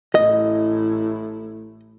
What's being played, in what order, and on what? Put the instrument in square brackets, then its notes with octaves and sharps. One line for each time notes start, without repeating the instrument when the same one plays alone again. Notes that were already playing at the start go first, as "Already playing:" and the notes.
[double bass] A1 E4 [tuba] A2 [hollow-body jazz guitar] D#5